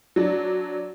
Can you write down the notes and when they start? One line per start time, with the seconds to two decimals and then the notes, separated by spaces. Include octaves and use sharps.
0.16 F#3 D4